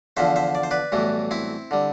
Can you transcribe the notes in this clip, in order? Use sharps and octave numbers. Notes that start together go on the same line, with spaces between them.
E2 D3 F3 C5 E5
C5 E5
D5
C5
B4 D5
B1 A2 E3 G3
C4 E4
D3 G3